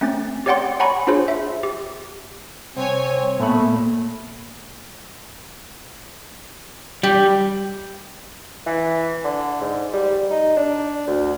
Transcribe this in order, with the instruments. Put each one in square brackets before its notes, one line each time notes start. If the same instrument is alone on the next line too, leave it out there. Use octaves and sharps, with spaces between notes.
[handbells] A3 C4 C#4 A6
G4 C#5 D5 F#5 G5 C6
C#5 F#5 G#5 A#5 B5 C#6
D4 F4 G#4 C5 C#5
E5
G4
[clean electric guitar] C2 [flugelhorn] C4 [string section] C#5 G#5
[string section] A#2 [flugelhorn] A3 [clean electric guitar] B3 B5
[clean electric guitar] G3 [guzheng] G4
[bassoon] E3
D3
G#2
G3
D#4
D4
D2